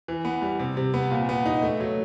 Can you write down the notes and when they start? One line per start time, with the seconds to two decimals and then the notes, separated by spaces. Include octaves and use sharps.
0.08 E3
0.25 B3
0.42 G3
0.59 C3
0.77 C3
0.94 B3
1.11 A#2
1.29 B3
1.46 D#4
1.62 A3
1.80 F#3